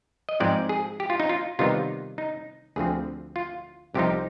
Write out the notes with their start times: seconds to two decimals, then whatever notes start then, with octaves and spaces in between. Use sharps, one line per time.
0.29 D#5
0.40 G#2 F3 G#3 C4 D5
0.69 G#4
1.00 G4
1.10 F4
1.20 D#4
1.29 F4
1.59 C3 D#3 G3 B3 D#4 F4
2.18 D#4
2.76 D2 D3 F3 C4 G#4
3.36 F4
3.94 C2 C3 F3 C4 D#4 G4